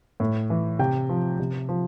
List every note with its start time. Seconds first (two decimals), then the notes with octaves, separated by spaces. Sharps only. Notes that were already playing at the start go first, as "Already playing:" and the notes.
0.20 A2
0.50 E3
0.79 C3 G5
1.09 F3
1.40 C3
1.69 F3